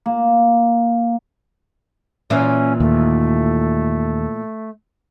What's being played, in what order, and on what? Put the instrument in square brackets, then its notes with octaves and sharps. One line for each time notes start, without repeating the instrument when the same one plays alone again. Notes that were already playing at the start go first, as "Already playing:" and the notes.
[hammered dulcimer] A#3
[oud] A#2 E3 A#3 [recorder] C#4
[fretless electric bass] D#2 [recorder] A3